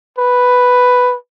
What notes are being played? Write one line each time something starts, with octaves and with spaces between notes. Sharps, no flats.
B4